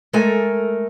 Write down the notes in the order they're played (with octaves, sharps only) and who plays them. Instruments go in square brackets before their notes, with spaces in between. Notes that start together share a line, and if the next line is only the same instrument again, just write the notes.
[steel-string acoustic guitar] G#3 A3 A4 A#4 G#5